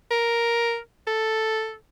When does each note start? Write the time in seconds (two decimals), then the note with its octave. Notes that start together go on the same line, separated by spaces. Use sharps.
0.11 A#4
1.07 A4